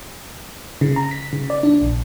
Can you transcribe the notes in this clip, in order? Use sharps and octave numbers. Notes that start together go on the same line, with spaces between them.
C#3
A#5
B6
C#3
D5
D4
A#1